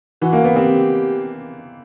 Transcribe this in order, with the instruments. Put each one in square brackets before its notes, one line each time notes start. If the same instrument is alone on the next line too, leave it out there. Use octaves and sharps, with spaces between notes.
[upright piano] E3 [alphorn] F#4
[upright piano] A#3
B3
[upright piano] C4 [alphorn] G4